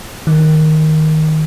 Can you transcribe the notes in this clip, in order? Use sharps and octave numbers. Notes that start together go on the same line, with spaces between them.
D#3